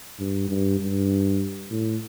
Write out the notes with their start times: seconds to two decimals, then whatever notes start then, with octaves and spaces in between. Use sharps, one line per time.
0.19 G2
0.49 G2
0.80 G2
1.71 A2